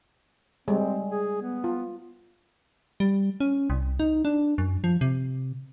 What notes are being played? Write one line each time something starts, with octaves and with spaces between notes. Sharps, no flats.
G3 G#3 C4
G#4
B3
F4
G3
C#4
C2
D#4
D4
F#2
F3
C3